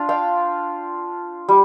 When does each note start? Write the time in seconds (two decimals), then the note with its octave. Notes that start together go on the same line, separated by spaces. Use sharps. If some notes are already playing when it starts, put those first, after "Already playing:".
Already playing: D4 F4
0.09 F5 G5
1.49 G3